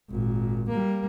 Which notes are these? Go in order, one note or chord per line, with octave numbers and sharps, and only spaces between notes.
G#1 A#2
G3 A#3